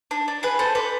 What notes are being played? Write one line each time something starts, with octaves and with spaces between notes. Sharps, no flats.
D4
D4
G#4 B4
A4 C5
B4 D5